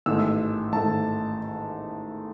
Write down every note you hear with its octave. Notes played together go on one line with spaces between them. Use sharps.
A1 G#2 D#3 A3 E6
A1 G#2 D#3 A3 A5